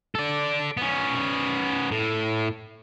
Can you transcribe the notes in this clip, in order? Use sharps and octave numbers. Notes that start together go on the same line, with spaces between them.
A4 D5
B3 C#4
A2